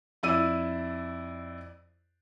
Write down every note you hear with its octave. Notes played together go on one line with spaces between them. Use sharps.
F2 E4 D5 E6 D#7